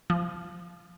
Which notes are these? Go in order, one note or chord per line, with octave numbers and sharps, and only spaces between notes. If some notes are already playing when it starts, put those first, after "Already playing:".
F3